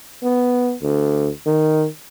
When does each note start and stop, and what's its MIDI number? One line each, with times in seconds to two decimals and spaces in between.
0.23 0.74 59
0.82 1.29 38
1.46 1.86 51